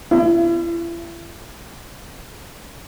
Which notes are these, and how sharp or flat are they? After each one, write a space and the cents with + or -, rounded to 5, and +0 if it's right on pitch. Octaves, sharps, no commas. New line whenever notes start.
E4 +40